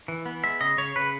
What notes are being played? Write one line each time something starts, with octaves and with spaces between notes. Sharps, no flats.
E3
B3
G#3 E5
C#3 D#5
C#3 C#5
C#3 B4